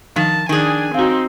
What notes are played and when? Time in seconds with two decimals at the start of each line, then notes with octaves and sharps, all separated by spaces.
0.16 D#3 F3 A5
0.49 D#3 D4 G#4 G#5
0.94 C4 D#4 F#4 F5